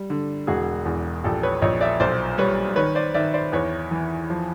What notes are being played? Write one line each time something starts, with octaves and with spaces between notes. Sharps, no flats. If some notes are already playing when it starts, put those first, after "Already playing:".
Already playing: G3
D3
E1 F#4 G#4
E2
A#1 G4 A4
B4 C#5
A#1 C#5 D#5
D5 E5
B1 C5 D5
G3 B4 C#5
D#3 B4 C#5
C5 D5
D#3 D5 E5
C5 D5
E2 B4 C#5
E3
F3